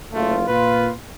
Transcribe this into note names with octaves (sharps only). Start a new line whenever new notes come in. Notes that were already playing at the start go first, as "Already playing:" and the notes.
F#1 A3 F4
A#2 F4 B4